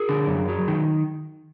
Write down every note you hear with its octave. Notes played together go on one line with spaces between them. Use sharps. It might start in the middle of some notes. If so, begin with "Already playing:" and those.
Already playing: G#4 A#4
D3
F#2
F#3
D#3